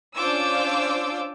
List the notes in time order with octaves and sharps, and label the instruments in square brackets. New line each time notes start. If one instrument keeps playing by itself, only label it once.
[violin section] C#4 D4 F4 C5 D6 E6